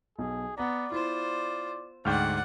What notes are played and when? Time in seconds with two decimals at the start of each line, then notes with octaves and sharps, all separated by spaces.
0.19 B1 G#4
0.58 B3 D5 F#5 A#5
0.92 E4 F4 C5
2.05 D2 G#2 D5 F#5 G5 C#6 F6 G6